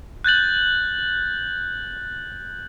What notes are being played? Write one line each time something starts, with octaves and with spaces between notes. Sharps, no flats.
F#6 G6 A6 F#7